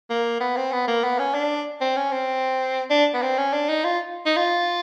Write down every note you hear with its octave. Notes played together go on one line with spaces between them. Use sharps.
A#3
B3
C4
B3
A#3
B3
C#4
D4
C4
C#4
C4
D4
B3
C4
C#4
D4
D#4
F4
D#4
F4